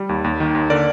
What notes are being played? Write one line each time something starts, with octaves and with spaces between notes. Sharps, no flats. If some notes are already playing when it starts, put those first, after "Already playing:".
Already playing: G3
D#2
D#2
D#3
D#2
D3 A#4 D5